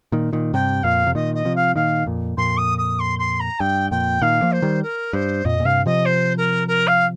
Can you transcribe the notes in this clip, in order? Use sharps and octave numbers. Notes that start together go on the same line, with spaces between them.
A#2 D#3
A#2 D#3
G2 C3 G5
F2 A#2 F5
C3
A#2 D#3 D#5
D#5
C3 F3
F5
A#2 D#3 F5
F2 A#2
F2 A#2 C6
D#6
D#6
C6
C6
A#5
G2 G5
F2 A#2 G5
A#2 D#3 F5
F3 A#3
C5
D#3 G3
A#4
G2 C5
F2 A#2 D#5
A#2
G2 C3 F5
C3 F3 D#5
C5
A#4
A#4
F5